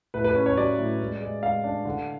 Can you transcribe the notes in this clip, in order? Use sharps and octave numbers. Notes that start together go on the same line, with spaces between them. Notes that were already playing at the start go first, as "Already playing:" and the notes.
A2 B4
B4
C#4 B4
C#5
F#3 D5
A2
G#3
G#3
G#3 F5
D4
D3